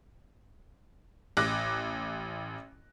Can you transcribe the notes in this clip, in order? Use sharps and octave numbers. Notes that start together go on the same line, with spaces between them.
A1 D6 F#6 A#6